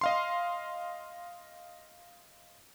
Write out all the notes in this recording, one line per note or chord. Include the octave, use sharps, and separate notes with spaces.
D#5 F5 C6